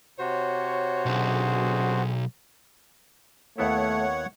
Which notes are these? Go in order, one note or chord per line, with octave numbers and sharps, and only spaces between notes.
C3 F#4 C5 C#5
B1 F#2 D3 G#4
D#2 A3 B3 E4 C#5 F#5